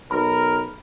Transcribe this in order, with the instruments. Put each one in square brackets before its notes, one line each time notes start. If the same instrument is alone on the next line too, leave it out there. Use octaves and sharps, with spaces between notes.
[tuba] B1 [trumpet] A#4 [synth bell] B5